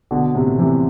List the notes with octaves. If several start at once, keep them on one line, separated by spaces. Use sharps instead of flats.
B2 D3
A2 C3
C3 E3